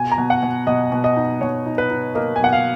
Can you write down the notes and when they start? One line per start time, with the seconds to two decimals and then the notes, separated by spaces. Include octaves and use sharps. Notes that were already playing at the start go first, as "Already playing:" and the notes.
Already playing: B2 G#5
0.12 A#5
0.18 B2
0.30 F#5
0.43 B2
0.67 B2 D#5
0.92 B2
1.04 D#5
1.16 D#4
1.41 B2 C#5
1.66 D#4
1.78 B4
1.90 D#4
2.15 A#3 D#5
2.36 G#5
2.40 B2 F#5
2.53 F5